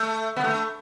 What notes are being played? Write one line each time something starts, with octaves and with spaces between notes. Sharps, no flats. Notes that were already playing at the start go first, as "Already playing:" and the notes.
Already playing: A3
B3
A3